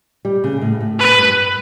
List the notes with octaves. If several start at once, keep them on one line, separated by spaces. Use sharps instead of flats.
G3
C#3
A2
A2
B4
G2